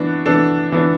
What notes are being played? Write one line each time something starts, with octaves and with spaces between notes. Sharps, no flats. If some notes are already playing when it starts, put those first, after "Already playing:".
Already playing: E3 B3 D4 F#4
E3 B3 D4 A4
E3 B3 D4